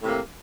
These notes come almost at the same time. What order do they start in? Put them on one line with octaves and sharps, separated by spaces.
A2 C3 A#3